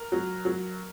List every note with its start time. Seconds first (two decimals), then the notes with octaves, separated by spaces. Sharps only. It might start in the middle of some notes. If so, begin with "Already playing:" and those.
Already playing: A#4
0.12 F#3
0.45 F#3